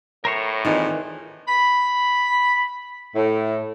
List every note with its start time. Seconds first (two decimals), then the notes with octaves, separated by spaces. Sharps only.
0.25 A2 A#4 C5 C#5
0.65 A#2 D#3 E3 G#3 C4
1.48 B5
3.16 A2